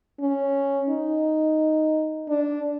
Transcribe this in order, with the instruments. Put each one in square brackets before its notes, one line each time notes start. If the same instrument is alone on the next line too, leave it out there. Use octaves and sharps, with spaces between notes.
[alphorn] C#4
D#4
D4